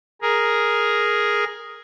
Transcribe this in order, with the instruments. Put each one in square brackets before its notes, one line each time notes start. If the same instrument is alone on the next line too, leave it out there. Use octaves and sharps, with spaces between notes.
[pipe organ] G#4 A#4